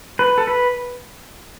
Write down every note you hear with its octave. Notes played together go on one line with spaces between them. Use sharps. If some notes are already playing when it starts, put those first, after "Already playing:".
B4
A4
B4